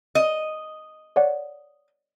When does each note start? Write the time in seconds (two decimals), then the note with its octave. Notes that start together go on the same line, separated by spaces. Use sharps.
0.15 D#5
1.16 C#5 D5 F#5